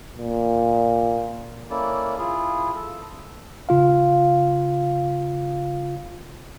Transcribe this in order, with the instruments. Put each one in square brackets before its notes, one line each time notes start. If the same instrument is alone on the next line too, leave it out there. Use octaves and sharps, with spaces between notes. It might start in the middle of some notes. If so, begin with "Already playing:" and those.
[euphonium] A#2
[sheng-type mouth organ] A#3 C#4 E4 A4 D5
E4 F4 G#4
A4
[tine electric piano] C#3 F4 F5